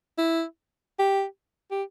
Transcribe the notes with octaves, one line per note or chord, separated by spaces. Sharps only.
E4
G4
G4